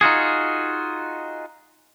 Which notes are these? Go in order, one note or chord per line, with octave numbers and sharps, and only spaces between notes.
D#4 F4 F#4 G#4